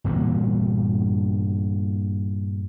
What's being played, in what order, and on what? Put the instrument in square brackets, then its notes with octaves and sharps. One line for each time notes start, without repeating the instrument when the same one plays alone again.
[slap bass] G2 A#2 E3 B3